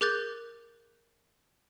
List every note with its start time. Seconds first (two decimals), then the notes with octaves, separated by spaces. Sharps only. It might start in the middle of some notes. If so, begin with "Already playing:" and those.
0.01 G#4 A#4 D6 F#6 G6 A6